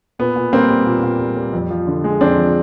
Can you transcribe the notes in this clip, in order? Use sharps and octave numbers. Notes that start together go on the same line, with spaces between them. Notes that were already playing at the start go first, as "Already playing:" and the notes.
A#2 B3
A#2
G3 A#3 C4
G3
A#2
A#2
G3
G3
F2
F3
D3
G#3
F2 C4 D4
F3